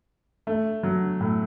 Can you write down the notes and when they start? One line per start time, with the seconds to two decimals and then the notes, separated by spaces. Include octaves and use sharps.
0.47 A3
0.83 F#3
1.21 A2